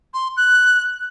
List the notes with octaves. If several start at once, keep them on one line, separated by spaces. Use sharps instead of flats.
C6
F#6